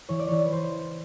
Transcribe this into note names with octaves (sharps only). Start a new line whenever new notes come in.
E3 C#5
D5
E3 C#5
B4
E3 C5